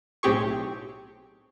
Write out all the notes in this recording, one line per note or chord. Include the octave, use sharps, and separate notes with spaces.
B1 A2 C4 G4 G#4 C#6